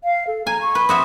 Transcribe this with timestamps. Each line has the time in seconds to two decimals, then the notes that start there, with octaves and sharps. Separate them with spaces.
0.04 F5
0.27 A4
0.47 G#5 A#5
0.61 C#6
0.75 B4
0.89 C4 F#4 E5 D#6